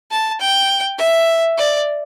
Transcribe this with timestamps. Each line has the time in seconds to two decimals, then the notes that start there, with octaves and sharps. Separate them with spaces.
0.11 A5
0.40 G5
0.99 E5
1.58 D5